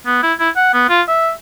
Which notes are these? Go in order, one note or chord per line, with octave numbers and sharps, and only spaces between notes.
B3
E4
E4
F#5
B3
F4
E5